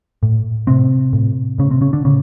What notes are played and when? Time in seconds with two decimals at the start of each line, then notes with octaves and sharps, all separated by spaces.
0.23 A2
0.67 A2 C3 C4
1.13 A2
1.58 A2 C#3 C#4
1.71 C3 C4
1.81 C#3 C#4
1.93 D3 D4
2.04 A2 C#3 C#4